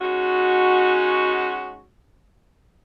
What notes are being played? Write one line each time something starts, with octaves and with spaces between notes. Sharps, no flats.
G#3 C#4 D#4 F#4